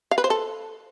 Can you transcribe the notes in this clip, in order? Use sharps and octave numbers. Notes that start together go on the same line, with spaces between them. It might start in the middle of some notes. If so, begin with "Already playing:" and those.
F5
B4
C5
A4